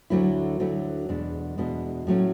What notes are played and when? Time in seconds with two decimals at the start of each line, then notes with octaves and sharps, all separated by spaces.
0.10 D2 D3 F#3 A3 E4
0.60 D2 D3 F#3 A3 E4
1.09 E2 B2 G#3 D4
1.58 E2 B2 G#3 D4
2.07 A2 F#3 A3 C#4